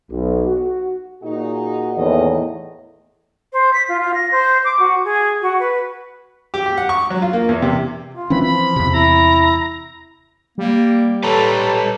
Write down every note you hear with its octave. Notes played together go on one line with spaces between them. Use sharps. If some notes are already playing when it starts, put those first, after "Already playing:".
B1
F#4
A#2 D#4 F#4 G#4
E2 A2 D#3 A#3 D#5
C5
B6
F4
F4
A#6
C5
D6
F#4
G#4
F#4
B4
G4
G4
F#5
C#6
F#3
F4
A#3
E2
C3
F4
E3 C4 C#4 B5
F3 B5
E2 C3
E4 A#5
G3 A#3
A4 B4 C#5 A5 A#5